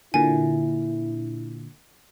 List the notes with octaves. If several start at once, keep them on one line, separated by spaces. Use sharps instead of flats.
A#2 D3 E4 G#5